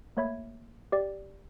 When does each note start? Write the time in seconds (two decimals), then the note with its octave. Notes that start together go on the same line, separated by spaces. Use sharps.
0.17 A3 A#3 C#5 E5 B5 G#6
0.92 G4 D5